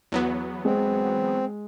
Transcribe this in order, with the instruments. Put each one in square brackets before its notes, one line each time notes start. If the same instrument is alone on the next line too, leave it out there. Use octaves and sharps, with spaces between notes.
[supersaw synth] E2 F#3 B3
[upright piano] G#3 [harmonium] C4